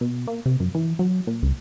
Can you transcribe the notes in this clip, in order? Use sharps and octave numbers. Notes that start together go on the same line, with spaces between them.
B2
A#3
C3
F#2
E3
F#3
A#2
C#2